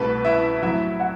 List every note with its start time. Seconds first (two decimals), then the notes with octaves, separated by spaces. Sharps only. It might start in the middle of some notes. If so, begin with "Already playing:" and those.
Already playing: C2 B2 A3 B4
0.25 E4 E5
0.62 A2 F#3 C4 E4 E5
1.00 F#4 F#5